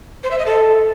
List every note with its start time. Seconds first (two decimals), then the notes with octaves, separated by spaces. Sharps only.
0.23 C5
0.31 E5
0.39 D#5
0.46 A4